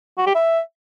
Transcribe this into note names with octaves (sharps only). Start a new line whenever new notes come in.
F#4
G4
E5